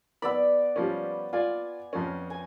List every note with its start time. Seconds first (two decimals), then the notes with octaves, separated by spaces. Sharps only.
0.22 B3 B4 D5 B5 E6
0.76 F3 G3 C#4
1.33 F4 D5 G#5
1.93 F2 F3 C#4
2.30 G#5